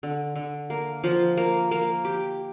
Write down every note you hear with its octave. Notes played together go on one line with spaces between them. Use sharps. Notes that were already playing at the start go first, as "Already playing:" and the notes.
D3
D3
A#3
F3
A#3
A#3
G4